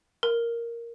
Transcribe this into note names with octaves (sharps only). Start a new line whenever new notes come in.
A#4